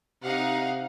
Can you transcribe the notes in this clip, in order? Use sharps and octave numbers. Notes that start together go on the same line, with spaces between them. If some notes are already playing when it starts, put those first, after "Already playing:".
C3 D#4 F5 F#5